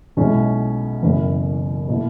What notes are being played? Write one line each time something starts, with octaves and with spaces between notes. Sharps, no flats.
B1 B2 G#3 C#4 E4
F#1 F#2 E3 B3 E4
B2 A#3 E4